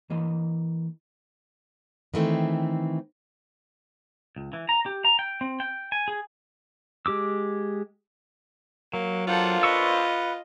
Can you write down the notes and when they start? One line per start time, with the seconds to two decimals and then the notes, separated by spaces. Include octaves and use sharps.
0.10 E3 A#3 D#5
2.14 D#3 E3 A3 C4
4.36 C#2
4.53 E3
4.69 A#5
4.86 G4
5.05 A#5
5.19 G5
5.41 C4
5.60 G5
5.92 G#5
6.08 G#4
7.06 G#3 G4 D6 E6
8.94 F#3 A#3
9.27 A#3 D4 F4 A4 C5 F#5
9.63 B4 D#5 C#6 E6